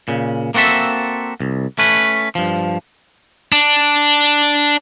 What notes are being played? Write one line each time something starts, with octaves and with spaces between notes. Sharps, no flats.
A#2 C#3
A#3 C4 F#4 A4 E5
C2
A3 C#4 B4
G2 F3
D4